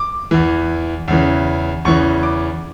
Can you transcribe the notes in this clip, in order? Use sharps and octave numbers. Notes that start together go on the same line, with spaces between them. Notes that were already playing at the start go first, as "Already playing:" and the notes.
Already playing: D6
E2 E3
E2 C#3 E3
E2 C#3 E3 C#6
D6